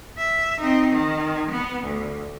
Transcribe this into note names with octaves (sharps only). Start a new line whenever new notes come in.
E5
C4 D#4
D#3
B3
D2